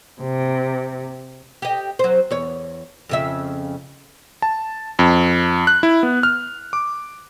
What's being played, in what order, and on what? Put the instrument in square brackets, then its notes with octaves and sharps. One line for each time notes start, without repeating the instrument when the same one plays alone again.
[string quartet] C3
[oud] G4 D#5
F#3 C5
E2 C#5
F2 C#3 E5
[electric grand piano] A5
F2
F#6
E4
B3
F6
D6